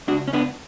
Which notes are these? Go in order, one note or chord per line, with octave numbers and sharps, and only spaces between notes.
C#2 D4 F#4
C#4
B3 D4